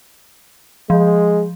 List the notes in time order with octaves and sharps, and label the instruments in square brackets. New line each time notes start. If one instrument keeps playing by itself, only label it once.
[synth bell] F3 [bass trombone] G#3